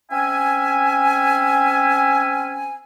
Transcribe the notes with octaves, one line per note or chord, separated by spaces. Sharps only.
C4 C#4 E5 G#5